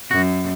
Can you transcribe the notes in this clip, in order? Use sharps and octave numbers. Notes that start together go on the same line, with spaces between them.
F#2 F#4